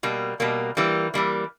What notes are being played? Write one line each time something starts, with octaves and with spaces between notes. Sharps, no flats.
B2 G3 A#3
B2 G3 A#3
E3 G3 A#3
E3 G3 A#3